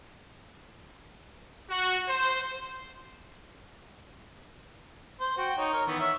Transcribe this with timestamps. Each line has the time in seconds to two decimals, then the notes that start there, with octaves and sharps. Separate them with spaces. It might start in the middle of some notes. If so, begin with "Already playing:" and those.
1.69 F#4
2.08 C5
5.20 C5
5.38 F#4 G5
5.57 D#4 C#5
5.73 A#4 C#5
5.87 D#3 E3 B3
6.00 C#5 E5